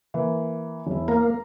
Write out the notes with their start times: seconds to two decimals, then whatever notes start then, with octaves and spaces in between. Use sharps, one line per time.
0.14 E3 A#3
0.87 E1 E4
1.08 A#3 A#5